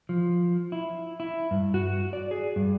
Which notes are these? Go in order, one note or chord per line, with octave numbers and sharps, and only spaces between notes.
F3
E4
E4
G2
F#4
D5
G#4
G2